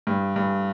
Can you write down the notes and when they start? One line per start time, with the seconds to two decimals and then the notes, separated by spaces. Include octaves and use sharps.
0.07 G2
0.36 G2